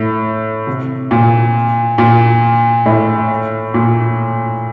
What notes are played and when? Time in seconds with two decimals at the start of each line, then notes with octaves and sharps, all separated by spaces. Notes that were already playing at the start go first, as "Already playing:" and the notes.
Already playing: A2
0.67 C3
1.11 A#2
1.98 A#2
2.86 A2
3.74 A#2